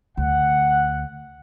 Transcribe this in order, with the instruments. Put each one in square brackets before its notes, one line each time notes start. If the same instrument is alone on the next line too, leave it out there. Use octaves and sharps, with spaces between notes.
[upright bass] D2 [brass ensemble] F#5